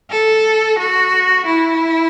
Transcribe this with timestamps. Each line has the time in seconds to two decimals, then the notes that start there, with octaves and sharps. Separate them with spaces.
0.11 A4
0.79 F#4
1.46 E4